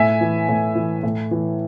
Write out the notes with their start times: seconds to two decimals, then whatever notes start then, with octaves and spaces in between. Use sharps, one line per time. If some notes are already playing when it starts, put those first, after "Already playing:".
Already playing: A2 E5 G#5
0.21 E3
0.48 A2
0.75 E3
1.03 A2
1.31 E3